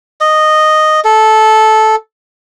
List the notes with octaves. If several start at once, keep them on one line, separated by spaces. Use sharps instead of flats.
D#5
A4